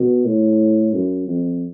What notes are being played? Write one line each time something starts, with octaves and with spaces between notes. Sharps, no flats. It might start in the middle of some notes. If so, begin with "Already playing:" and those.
Already playing: B2
A2
F#2
F2